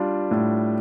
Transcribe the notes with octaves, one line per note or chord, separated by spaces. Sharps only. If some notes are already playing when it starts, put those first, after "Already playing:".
Already playing: G3 D4 F4
A2